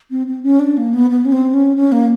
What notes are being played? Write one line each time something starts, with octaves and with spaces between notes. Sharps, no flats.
C4
C4
C#4
D4
A#3
B3
B3
C#4
C4
C#4
C#4
A#3